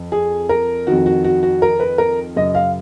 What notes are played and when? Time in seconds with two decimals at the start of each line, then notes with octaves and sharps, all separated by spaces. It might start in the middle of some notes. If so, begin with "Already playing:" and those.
Already playing: F2
0.12 G#4
0.49 A#4
0.87 F2 D#3 F#4
1.06 F#4
1.24 F#4
1.43 F#4
1.62 A#4
1.80 B4
1.98 A#4
2.36 F#2 C#3 D#5
2.55 F5